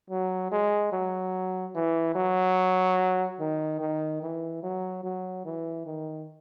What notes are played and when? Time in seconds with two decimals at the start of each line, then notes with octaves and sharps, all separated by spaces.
0.10 F#3
0.52 G#3
0.92 F#3
1.75 E3
2.15 F#3
3.40 D#3
3.80 D#3
4.22 E3
4.63 F#3
5.04 F#3
5.45 E3
5.86 D#3